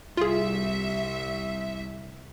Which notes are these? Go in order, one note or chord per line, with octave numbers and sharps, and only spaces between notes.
C2 F4 G#4 E5